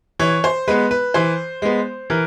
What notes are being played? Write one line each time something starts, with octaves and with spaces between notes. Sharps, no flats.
E3 C#5
C5
G#3 B3 B4
B4
E3 C5
G#3 B3
E3 A#4